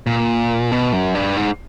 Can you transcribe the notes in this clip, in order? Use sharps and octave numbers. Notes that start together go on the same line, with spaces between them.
A#2
B2
F#2
G2
G#2